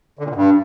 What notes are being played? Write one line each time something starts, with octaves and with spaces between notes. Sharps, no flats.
D3
A#2
B2
G2